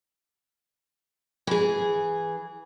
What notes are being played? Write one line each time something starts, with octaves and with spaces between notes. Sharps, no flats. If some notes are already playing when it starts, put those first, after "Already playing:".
E3 G#4